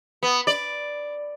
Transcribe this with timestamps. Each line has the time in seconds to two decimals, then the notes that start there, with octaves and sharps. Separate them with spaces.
0.23 B3
0.47 D5